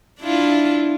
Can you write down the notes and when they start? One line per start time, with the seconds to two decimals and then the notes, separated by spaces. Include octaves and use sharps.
0.20 D4 E4 F4